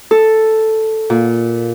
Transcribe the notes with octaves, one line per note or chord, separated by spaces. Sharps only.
A4
A#2